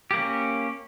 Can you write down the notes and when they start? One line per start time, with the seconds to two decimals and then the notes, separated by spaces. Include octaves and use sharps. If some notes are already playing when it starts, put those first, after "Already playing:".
0.11 G4
0.14 A#3
0.17 C#4